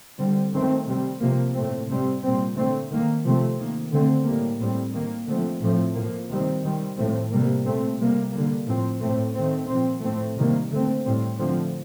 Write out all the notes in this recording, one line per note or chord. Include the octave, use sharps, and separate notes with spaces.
D3 G3 C4
D#3 A3 C4
C3 G3 C4
C3 F3 A#3
A2 A3 C4
C3 G3 C4
A#2 G3 C4
D3 A3 C4
D#3 A#3
C3 F3 A3 C4
D#3 A#3
D3 A3 C4
A2 G3 A#3
A2 G3 C4
D#3 A#3
D3 F3 A3 C4
A2 F3 A3 C4
A2 F3 A#3
C3 D#3 G3 C4
D#3 G3 C4
A2 F3 A3 C4
C3 G3 A#3
A#2 A3 C4
C3 G3 A#3
D3 G3 A#3
A2 F3 C4
A2 A3 C4
D#3 A3 C4
A#2 F3 C4
A2 A3 C4
C3 D#3 G3 A#3
D3 A3 C4
A2 G3 C4
D3 F3 A3 C4